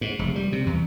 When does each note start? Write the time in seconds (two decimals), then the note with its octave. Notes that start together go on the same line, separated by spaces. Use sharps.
0.01 G#2
0.19 F1
0.36 G3
0.52 C3
0.66 E2